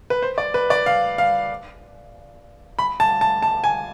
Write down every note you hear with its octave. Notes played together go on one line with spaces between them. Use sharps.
B4
C5
D5
B4
D5
F5
F5
B5
A5
A5
A5
G#5